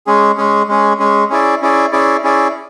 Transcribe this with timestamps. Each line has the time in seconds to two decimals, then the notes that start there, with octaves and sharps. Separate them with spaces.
0.07 G#3 C#4 G#4
0.38 G#3 C#4 G#4
0.68 G#3 C#4 G#4
0.99 G#3 C#4 G#4
1.30 C#4 E4 G#4 D5
1.62 C#4 E4 G#4 D5
1.92 C#4 E4 G#4 D5
2.23 C#4 E4 G#4 D5